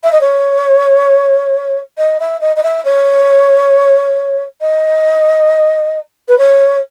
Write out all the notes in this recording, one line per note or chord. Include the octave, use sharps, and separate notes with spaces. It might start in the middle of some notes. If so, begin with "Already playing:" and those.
E5
D#5
C#5
D#5
E5
D#5
D#5
E5
C#5
D#5
B4
C#5